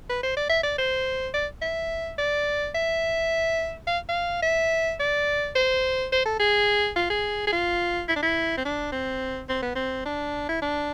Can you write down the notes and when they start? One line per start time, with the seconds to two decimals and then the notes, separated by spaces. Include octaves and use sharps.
0.10 B4
0.23 C5
0.37 D5
0.50 E5
0.63 D5
0.78 C5
1.34 D5
1.62 E5
2.19 D5
2.75 E5
3.87 F5
4.09 F5
4.43 E5
5.00 D5
5.56 C5
6.12 C5
6.25 A4
6.40 G#4
6.96 F4
7.10 G#4
7.47 G#4
7.53 F4
8.09 E4
8.16 D4
8.23 E4
8.57 C4
8.65 D4
8.92 C4
9.49 C4
9.63 B3
9.76 C4
10.05 D4
10.49 E4
10.62 D4